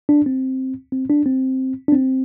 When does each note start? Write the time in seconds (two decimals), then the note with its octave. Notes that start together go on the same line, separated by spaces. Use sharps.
0.09 D4
0.26 C4
0.92 C4
1.10 D4
1.26 C4
1.88 D4
1.92 C4